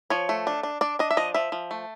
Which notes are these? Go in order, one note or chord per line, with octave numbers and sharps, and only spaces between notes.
F3 C#5
A3
D4
D4
D4 D5
D4 D#5
E5
F3 D#5
F3 E5
F3
A3